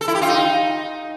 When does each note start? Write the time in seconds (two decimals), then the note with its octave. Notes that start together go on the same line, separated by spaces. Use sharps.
0.01 A4
0.08 E4
0.15 G4
0.22 F4
0.28 D#4